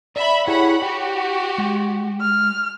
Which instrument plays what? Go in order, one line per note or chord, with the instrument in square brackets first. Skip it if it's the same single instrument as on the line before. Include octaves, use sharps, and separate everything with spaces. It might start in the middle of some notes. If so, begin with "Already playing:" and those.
[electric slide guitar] D5 [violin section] E5 B5
[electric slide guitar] E4 G4 G#4 [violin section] C#5 F#5 B5
[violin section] F#4 G4 [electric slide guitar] F#5
[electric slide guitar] G#3
[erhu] F6